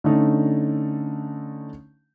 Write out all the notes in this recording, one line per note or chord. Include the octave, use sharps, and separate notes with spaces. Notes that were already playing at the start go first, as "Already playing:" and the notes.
D3 A3 C#4 D#4